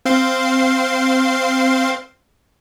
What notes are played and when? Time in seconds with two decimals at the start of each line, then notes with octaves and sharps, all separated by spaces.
0.05 C4 F5 C6